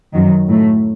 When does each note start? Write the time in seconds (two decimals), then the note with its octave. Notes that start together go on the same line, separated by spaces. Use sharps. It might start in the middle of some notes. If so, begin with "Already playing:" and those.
0.14 F#2 D#3 F#3
0.48 A2 F#3 A3